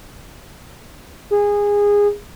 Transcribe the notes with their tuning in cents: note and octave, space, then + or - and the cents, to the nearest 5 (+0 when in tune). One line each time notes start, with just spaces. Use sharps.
G#4 -20